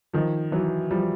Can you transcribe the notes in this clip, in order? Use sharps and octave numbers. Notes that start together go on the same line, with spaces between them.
D#3 F3
E3 F#3
F3 G3